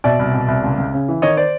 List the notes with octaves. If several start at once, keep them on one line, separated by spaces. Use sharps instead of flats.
B2 D5 E5
C2
B2
C2
C#2
C#2
C#3
E3
D#3 C#5 D#5
C5 D5